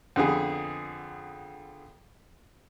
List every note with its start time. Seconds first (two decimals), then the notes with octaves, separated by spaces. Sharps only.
0.16 F2 D3 B3 G#4